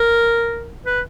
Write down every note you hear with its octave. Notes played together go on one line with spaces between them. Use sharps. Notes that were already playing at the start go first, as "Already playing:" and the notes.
Already playing: A#4
B4